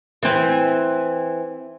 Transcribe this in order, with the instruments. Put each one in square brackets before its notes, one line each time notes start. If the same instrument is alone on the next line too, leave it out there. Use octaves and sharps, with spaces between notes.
[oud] E3 C4